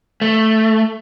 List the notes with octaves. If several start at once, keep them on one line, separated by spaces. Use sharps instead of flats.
A3